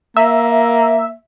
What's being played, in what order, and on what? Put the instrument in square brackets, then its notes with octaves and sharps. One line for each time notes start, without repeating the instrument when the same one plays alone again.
[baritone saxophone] A#3 [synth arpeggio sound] E5